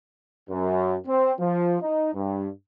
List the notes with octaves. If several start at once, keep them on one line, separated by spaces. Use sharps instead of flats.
F#2
C4
F3
D#4
G2